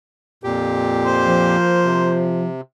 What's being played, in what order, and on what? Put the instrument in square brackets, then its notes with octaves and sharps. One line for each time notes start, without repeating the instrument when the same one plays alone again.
[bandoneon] F2 A#2 G4
[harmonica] A#3 C5
[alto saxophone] F3
[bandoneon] C3